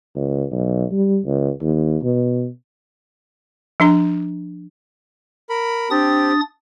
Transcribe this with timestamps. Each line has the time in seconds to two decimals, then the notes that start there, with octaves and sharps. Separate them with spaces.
0.16 C#2
0.51 B1
0.92 G3
1.26 C#2
1.61 D#2
2.03 B2
3.80 F3 D4 A#5
5.50 A#4 B5
5.90 C4 D4 G4 D#6 A6